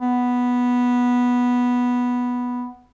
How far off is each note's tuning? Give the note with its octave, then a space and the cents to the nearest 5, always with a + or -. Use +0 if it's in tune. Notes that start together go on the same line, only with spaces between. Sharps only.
B3 -5